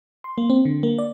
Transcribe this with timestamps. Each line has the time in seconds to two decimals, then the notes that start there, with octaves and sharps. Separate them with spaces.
0.24 C6
0.38 A#3
0.50 C4
0.65 D3
0.83 A#3
0.98 D5